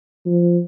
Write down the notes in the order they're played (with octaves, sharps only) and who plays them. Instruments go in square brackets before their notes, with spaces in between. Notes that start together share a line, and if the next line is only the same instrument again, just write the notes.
[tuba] F3